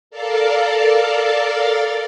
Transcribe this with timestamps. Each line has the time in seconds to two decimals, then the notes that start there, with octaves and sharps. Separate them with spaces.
0.11 A4 A#4 D5 F5 A5